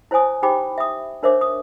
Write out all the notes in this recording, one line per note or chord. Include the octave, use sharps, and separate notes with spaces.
E4 C5 C#5 G#5 D#6
D#4 G4 C5 G5 B5 D6
E5 D#6
D4 A#4 C5 C#5 E5 D6
D#6